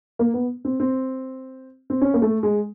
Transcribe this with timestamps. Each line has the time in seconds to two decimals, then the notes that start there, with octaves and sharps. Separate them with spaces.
0.19 A#3
0.34 B3
0.65 C4
0.80 C4
1.90 C4
2.01 C#4
2.14 A#3
2.22 A3
2.43 G#3